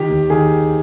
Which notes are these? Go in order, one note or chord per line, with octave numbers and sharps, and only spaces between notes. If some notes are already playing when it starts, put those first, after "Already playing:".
Already playing: D#3 G4
D#2
D#3 G#4